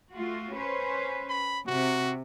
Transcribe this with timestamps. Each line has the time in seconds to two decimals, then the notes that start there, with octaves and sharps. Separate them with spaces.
0.12 A3 F4 F#4
0.55 C#4 B4 C5
1.29 B5
1.67 C3 F#4